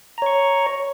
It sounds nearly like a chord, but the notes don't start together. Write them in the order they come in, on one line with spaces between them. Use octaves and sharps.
A#5 C#5 C#6